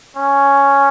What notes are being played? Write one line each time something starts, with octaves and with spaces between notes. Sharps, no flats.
C#4